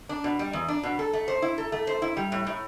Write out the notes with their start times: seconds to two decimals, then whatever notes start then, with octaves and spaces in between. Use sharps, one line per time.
0.09 D4
0.24 B2
0.39 G3
0.53 E2
0.68 D4
0.83 B2
0.99 A4
1.13 A3
1.28 C5
1.42 E4
1.58 A4
1.72 A3
1.87 C5
2.02 E4
2.17 G3
2.32 A2
2.47 A2